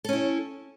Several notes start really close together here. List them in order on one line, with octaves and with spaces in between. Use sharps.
A4 C#4 E4